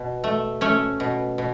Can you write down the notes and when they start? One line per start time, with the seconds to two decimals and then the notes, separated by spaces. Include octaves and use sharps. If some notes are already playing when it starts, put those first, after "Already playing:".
Already playing: B2
0.24 A3
0.61 A3 C#4 C#5
1.00 B2
1.38 B2